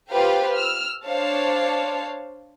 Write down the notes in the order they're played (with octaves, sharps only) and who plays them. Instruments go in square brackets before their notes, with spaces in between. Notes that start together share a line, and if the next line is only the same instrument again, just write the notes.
[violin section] F4 G4 B4 C5 F5 G5
E6 F6
D4 C5 C#5 F5 A5